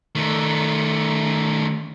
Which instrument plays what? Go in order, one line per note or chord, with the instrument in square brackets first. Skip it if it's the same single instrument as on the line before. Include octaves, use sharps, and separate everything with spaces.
[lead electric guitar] D#3 A3